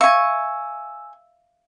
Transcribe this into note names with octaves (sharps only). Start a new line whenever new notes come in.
E5 F5 G#5 C#6 E6